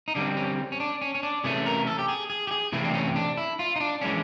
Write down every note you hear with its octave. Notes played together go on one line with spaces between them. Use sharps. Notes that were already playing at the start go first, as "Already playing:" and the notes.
D#4
D3 G3 C4 D4
C#4
C#4
D4
C#4
C#4
D4
C3 E3 A3 C#4 G#4
A#4
A4
G4
G#4
G#4
G4
G#4
C3 E3 A3 C4 E4
D4
C#4
D4
E4
F4
D#4
D4
E3 G#3 C#4 D4